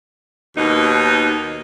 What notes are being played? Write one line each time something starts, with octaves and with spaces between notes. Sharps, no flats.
D#2 B2 D#4